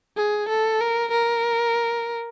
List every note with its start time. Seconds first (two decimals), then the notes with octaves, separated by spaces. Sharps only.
0.17 G#4
0.49 A4
0.81 A#4
1.12 A#4